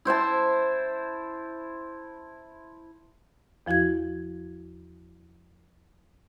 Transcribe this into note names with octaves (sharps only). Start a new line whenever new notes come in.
E4 C5 E5 A5
E2 F3 E4 F#4 G#6